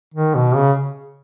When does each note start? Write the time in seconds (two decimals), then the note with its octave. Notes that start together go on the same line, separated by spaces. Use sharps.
0.14 D#3
0.35 B2
0.56 C#3